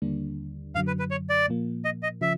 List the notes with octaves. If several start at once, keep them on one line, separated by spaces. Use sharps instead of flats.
D#2 D3 G3 A#3 D4
F#2 D3 F#3 F5
B4
B4
C#5
D5
A#2 F3 A#3
D#5
D#5
C#3 F3 E5